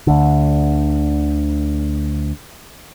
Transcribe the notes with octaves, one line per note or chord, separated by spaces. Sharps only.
D2 D3